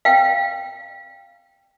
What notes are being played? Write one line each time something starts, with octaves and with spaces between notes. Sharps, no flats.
F5 G5